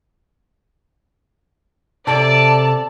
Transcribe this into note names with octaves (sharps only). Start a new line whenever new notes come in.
C3 A4 D5 A5